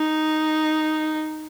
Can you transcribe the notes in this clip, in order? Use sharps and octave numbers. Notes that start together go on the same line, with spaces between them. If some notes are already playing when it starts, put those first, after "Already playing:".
Already playing: D#4